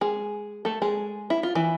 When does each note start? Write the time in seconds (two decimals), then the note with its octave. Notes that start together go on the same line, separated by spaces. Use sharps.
0.01 G#3 G#4
0.65 A3 A4
0.82 G#3 G#4
1.30 E4
1.43 F4
1.55 E3 E4